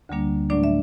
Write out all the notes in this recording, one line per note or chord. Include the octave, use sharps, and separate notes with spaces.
D2 D3 G3 A#3 D4
A2 F#3 A3 D4 D5
E5